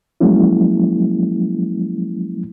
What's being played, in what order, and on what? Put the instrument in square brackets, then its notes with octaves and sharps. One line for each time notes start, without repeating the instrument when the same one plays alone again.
[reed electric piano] F3 F#3 G#3 A#3 C#4 E4